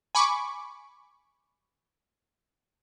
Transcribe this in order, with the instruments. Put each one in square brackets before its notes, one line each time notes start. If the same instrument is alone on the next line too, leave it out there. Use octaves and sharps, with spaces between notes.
[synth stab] G#5 B5 C#6 D6